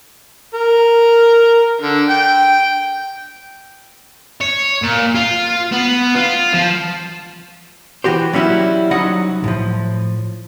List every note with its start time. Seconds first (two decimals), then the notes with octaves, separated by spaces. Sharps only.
0.54 A#4
1.81 D3
2.10 G5
4.41 C#5
4.82 A#2
5.15 F4
5.72 B3
6.16 F4
6.53 F3
8.04 E3 F#4 G4 C5
8.33 F#3 G3 C#4 E4 F#4
8.91 C2 F#3 D#4 D#5 F#5
9.44 A2 F3